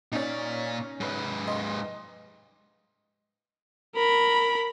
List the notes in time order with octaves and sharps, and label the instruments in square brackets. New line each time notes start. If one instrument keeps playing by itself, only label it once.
[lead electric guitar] A#2 D5 [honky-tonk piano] C#4 D#4
[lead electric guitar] G#2 B4
[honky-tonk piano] D#5 C6
[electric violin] A#4 B5